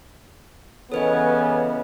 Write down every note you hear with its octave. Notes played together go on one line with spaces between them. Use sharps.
C#3 E3 B3 A4 B4 C#5 D#5